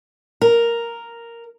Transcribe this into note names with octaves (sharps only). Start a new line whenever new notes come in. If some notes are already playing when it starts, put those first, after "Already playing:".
A#4